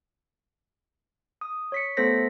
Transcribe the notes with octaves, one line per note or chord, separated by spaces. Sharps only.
D#6
C#5 B6 C#7
A3 B3 A4 C5 A#6 B6